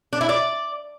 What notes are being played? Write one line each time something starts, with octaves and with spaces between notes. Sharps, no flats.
D4
E4
D5